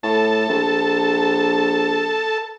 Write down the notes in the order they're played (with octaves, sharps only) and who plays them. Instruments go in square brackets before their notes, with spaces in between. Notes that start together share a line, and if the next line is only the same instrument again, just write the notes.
[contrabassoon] A2 [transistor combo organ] A4 A5
[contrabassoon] A#1